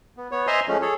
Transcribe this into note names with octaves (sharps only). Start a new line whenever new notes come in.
B3
B3 C#5
C5 D#5 E5 G#5 A#5 C6
F3 G#3 A3 C#4
G#4 A4 C#5